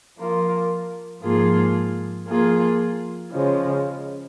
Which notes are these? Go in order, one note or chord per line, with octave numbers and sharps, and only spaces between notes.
F3 A#3 F4
G#2 F3 A#3 F4 G#4
F3 A#3 F4 G#4
C#3 F3 G#3 C#4